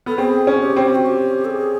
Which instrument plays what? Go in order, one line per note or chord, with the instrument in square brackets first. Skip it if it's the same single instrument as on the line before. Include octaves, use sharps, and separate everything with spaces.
[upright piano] B3 [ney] A4
[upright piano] C4 [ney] G#4
[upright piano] C#4
[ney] G4
[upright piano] C4
[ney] F#4
G4
A4
G#4